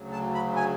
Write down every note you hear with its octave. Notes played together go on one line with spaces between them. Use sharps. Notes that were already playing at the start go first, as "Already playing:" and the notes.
Already playing: D2 C#3 F#3
A5
B5
G#5